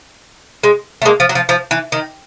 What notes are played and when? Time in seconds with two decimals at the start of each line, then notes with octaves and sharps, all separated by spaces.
0.63 G#3
1.02 A3
1.05 G#3 A#3
1.20 F3
1.29 F#3
1.35 F3
1.49 F3
1.71 E3
1.92 D#3